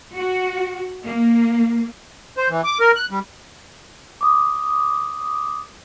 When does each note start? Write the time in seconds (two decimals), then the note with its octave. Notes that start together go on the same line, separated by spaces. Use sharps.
0.15 F#4
1.04 A#3
2.37 C5
2.50 E3
2.64 D6
2.80 A#4
2.96 F#6
3.11 G3
4.21 D6 D#6